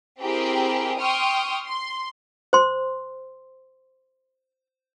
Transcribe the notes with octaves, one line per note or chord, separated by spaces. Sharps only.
C4 E4 G4 G#4 A#4 G5
G5 C6 C#6 D#6 F6
C6
C5 C6